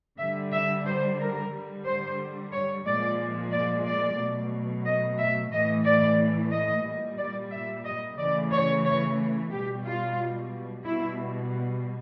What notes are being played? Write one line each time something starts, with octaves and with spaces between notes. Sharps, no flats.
D3 G3 E5
E5
C5
A#4
D3 G3
C5
C#5
A#2 F3 G#3 D5
D5
D5
B2 F#3 A3
D#5
E5
A2 E3 A3 D#5
D5
D#5
A#2 G3
D5
E5
D#5
C#3 E3 A3 D5
C#5
C#5
B2 G3 G4
F4
B2 G3 E4